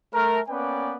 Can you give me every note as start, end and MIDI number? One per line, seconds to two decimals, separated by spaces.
0.14 0.40 57
0.14 0.40 70
0.49 0.95 58
0.49 0.95 59
0.49 0.95 61
0.49 0.95 71
0.49 0.95 74
0.49 0.95 79